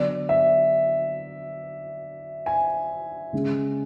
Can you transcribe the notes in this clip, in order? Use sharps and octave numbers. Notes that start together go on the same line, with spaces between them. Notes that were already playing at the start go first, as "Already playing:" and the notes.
Already playing: D3 F#3 B3 D5
E5
G#5
C#3 G#3 C#4